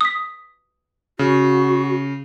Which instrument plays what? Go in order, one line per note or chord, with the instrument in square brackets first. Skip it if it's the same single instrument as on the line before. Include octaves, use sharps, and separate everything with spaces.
[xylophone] D#6 B6
[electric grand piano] C#3 [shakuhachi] F#4